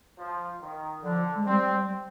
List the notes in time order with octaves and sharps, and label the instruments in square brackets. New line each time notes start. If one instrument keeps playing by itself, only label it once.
[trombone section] F3
D#3
[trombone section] D3 [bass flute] F3
[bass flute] G#3
[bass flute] G3 [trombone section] C4